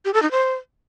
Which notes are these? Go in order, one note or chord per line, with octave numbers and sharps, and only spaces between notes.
G4
A4
D#4
C5